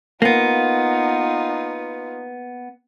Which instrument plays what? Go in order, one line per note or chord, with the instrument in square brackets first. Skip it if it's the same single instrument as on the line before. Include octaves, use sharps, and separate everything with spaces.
[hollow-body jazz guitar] A#3 B3 [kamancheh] D#4 F4